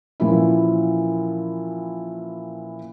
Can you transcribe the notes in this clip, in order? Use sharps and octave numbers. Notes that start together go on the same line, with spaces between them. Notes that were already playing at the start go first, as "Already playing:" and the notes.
A#2 E3 F3 C#4 E4